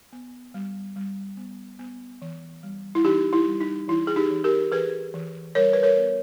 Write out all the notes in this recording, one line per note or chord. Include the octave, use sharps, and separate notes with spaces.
B3
G3
G3
B3
B3
E3
G3
E4
E3 D#4 G4
E4
G3
D#4
E3 E4
G#4
D#4 G4
E3
G4 A#4
E3 G#4 B4
E3
G3 A#4 C#5
B4
A#4 C#5
B3